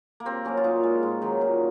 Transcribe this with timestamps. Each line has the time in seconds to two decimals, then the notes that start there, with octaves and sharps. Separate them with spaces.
0.20 A#3
0.25 C3 C4
0.45 F#3 A#3 C#4
0.57 F4
0.64 A#2 D#4
0.83 G#3
1.03 G#2
1.22 D#3 F#3
1.41 A#2